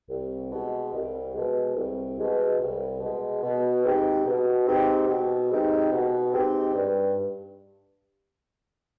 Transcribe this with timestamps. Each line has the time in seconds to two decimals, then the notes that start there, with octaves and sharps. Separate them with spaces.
0.09 C2
0.52 B2 G#3
0.93 C2
1.34 B2 G#3
1.75 C2
2.18 B2 G#3
2.59 C2
3.00 B2 G#3
3.42 B2
3.84 G#3 C4 D#4 G4
4.25 B2
4.66 G#3 C4 D#4 G4
5.08 B2
5.50 G#3 C4 D#4 G4
5.91 B2
6.33 G#3 C4 D#4 G4
6.74 G2